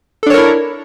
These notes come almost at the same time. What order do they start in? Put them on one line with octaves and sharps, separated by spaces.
A4 D4 C#5 A#4 E4